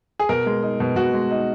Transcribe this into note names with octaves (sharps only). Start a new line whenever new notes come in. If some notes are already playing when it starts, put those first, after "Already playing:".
G#4
B2 A#4
G#3
D#4
B2
B2 F#4
G#3
D#4